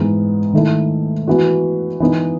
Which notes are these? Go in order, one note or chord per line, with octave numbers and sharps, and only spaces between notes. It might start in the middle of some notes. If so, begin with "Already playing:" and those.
Already playing: G#2 E3 B3
D#3 A3 E4
E3 B3 F#4
E3 B3 D#4